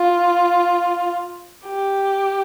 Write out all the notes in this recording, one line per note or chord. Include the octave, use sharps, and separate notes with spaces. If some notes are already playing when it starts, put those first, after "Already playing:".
Already playing: F4
G4